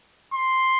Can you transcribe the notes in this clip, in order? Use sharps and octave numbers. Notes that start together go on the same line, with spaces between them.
C6